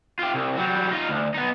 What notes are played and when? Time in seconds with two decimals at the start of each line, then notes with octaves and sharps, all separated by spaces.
0.19 F4 G4
0.34 C2
0.56 F#3 G3
0.91 D#4 F4
1.09 D2
1.34 B3 D#4